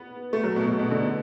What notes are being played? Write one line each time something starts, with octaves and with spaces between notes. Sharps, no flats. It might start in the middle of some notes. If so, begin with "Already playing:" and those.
Already playing: B3
A3
F#3
B2
B2
B2
D3